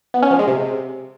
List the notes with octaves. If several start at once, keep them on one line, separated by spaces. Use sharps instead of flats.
B3
C#4
F3
G#3
C3